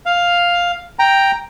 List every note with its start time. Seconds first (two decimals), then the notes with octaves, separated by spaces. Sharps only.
0.06 F5
0.99 G5 A#5